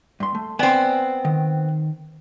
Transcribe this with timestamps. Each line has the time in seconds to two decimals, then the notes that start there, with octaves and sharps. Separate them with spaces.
0.20 G2 C6
0.35 A3
0.59 B3 C4 D5 G5 G#5
1.25 D#3